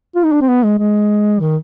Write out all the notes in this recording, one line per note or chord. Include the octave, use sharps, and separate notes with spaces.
F4
D#4
D4
C4
B3
G#3
G#3
D#3